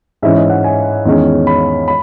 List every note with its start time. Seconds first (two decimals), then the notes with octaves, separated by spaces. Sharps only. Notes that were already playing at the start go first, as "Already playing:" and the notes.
0.22 G#2 E3 G#3 C#4 E5
0.37 D#5
0.50 F#5
0.64 G#5
1.05 E2 D#3 G#3 C#4
1.47 B5
1.88 B5